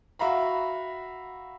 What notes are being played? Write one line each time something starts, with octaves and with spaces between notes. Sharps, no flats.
F#4 E5 F5 A#5 B5